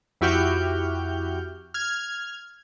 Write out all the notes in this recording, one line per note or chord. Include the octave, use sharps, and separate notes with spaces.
F2 E4 F#4 G4 F6 G6
F6 G#6